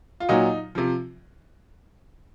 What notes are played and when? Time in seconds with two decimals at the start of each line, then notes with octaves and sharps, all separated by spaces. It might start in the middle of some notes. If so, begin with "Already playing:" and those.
0.20 F4
0.29 A#2 F#3 D#4
0.75 C3 F3